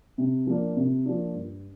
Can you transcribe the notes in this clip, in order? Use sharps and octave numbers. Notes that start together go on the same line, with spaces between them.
C3
F3 A#3 D4
C3
F3 A#3 D4
G2